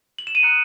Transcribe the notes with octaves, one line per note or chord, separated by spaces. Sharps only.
F#7
E7
D#7
A#5 D#6 F#6 C#7